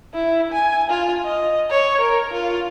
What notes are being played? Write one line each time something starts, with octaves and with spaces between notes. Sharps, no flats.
E4
G#5
F4
D#5
C#5
A#4
F4